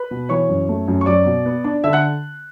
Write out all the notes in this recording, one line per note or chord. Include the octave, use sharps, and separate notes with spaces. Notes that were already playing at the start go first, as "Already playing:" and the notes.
Already playing: B4 B5
B2
E3 C#5 C#6
F#2
A3
F#2
C#6
F#3 D5 D6
B2
B3
D4
D3 E5 E6
F#5 F#6